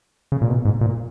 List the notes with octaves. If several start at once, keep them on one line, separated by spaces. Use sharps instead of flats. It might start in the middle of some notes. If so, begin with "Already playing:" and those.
C#3
A#2
B2
G#2
A#2